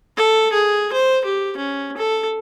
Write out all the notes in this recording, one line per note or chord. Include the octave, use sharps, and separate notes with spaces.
A4
G#4
C5
G4
C#4
A4